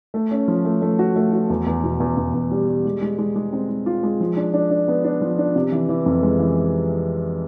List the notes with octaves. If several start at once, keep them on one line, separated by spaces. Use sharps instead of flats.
A3
C#4
F3
A3
A3
F#4
A3
F#4
E2
E2
B2
E2
E2
E2
G3
G3
G#3
G#3
G#3
G#3
C4
G#3
F4
G#3
F3
D4
D4
D4
B3
D4
F3
D4
C3
E3
E3
F2
G#3
E3